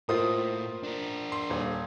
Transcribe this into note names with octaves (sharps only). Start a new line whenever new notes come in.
A2 A#3 F4 C5 D#6
D4 A#4
C6
D#1